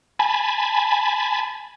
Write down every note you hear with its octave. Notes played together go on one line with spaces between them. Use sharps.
G#5 A5 B5